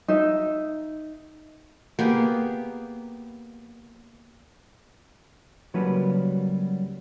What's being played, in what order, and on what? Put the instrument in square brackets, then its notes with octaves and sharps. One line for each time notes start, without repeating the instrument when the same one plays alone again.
[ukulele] D#4 E5
[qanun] A#3 B3 G4 G#4
[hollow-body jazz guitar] C#3 F#3 G3 A#3 F#4 B4